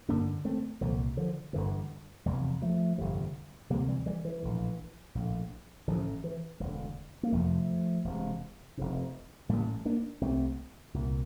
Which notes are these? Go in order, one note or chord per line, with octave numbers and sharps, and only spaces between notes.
A1 G2 D3 A#3 D4
A3 C4
C2 A#2 D3 F3
D3 F3
G1 G2 D3 E3
F1 E2 C3 E3 G3
F3 A3
G1 F2 C3
D2 C3 G3 A#3
E3 G3
E3 G3
E3
A#1 A2
A#1 A2
A1 A2 D3 F3
E3
E1 D2 D3 E3
A#3
F1 F2 C3 F3 A3
E1 E2 C3
F1 F2 C3
A1 A2 G3 A#3
A#3 D4
C2 C3 A3 C4
C2 A#2